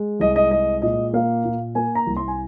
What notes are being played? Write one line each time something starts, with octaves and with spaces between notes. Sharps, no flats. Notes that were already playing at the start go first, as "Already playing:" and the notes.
Already playing: G#3
C2 D#5
D#5
G#3 D#5
A#2 D#5
A#3 F5
A#2
A#3 G#5
A#5
C2
C6
G#5